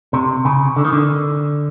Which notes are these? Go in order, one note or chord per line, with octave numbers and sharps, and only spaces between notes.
C3
C#3
D3
D#3
D3